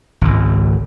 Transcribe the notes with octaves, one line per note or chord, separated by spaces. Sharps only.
G#1 C#2